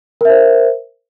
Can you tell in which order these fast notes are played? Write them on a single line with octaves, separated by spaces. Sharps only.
A#4 E5 C5